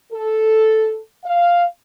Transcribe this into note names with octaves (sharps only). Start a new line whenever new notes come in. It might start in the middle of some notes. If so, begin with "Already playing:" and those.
A4
F5